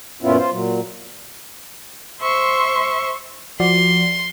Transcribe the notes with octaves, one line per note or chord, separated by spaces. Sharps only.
F#2 A#2 B3 C#4 E4 F4
F4 C5
A#2 F#3
C5 E5 C6 C#6
F3 F#4 D5 C6